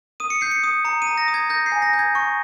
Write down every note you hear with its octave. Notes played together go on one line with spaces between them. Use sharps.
D#6 D#7
C#7
G6 C7
C#7
D#6
A#5 C#7
D#7
A#5
A#6
D#6
G#6
G6 A#6
C7
G#5
A#6
G6
G#6
C#6